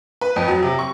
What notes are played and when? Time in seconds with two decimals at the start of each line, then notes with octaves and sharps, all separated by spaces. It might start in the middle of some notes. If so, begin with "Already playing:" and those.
0.21 B4
0.36 F2
0.48 F#3
0.63 C3
0.79 C#6